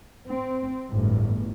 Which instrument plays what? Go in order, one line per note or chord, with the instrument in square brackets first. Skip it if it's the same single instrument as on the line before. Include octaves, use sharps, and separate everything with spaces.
[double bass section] C4
G1 E2 A2